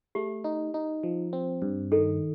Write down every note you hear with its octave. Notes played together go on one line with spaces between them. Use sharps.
A3 G4
D#4
D#4
F3
C4
G2
D#3 A4